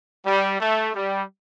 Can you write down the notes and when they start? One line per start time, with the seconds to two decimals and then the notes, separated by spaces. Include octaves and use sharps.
0.26 G3
0.60 A3
0.94 G3